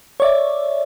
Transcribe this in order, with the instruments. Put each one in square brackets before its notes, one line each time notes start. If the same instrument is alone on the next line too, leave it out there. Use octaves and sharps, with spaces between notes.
[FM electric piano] C#5 D5 E5